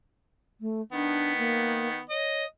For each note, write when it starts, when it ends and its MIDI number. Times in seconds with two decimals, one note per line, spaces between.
0.60 0.81 57
0.92 2.01 51
0.92 2.01 59
0.92 1.32 62
1.37 1.88 58
2.10 2.45 73
2.10 2.44 75